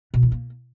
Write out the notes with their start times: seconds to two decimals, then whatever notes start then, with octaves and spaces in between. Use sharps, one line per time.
0.14 B2
0.23 E3
0.32 A#3